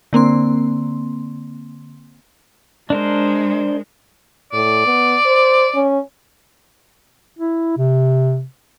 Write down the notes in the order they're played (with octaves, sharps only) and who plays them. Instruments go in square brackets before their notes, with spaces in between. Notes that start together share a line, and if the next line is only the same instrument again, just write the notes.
[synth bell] D3 A#3 C4 C6
[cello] G#3 [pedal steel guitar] D4 A#4 C5
[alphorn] A2 [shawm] D5
[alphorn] B3
C5
C#4
[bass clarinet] E4
C3